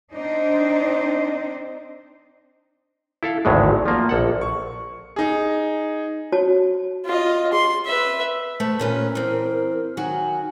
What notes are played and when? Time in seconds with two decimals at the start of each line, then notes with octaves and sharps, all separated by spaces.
0.14 C4 D4 D#4 C5
3.23 E4 A4 F5
3.45 G#1 D2 A2 F#3 G#3
3.85 F3 A#3
4.09 A#1 A4 F#5
4.41 C#6
5.16 D#4 G#4
6.32 F#4 C#5 A5
7.05 F4 D#5
7.53 G#4 C6
7.85 B4 E5
8.60 A3 B4 C5 E5
8.79 A#2 C#4 A#4 B4
9.15 E3 C4
9.97 D#3 F#3 F#4 G#5